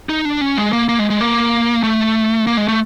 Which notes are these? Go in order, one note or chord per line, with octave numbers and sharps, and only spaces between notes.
D#4
D4
C#4
G#3
A#3
A#3
G#3
G#3
A#3
A3
A#3
G#3
A3